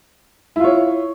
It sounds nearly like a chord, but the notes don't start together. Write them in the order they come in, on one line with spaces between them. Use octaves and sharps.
E4 F4 C#5